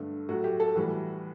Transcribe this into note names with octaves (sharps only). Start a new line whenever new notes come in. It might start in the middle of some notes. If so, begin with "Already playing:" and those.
Already playing: G2 D3 A3
A2 F#3 A3 F#4
G4
A4
A2 E3 G3 F#4